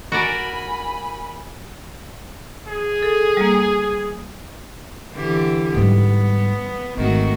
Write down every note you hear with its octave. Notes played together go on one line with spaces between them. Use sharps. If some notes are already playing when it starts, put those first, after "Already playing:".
F#4 A#4 D5 G#5 B5
G#4
A4
G3 A#3
D3 E3 G4
G#2 G3 B3
G#1 D#3 A3 F#4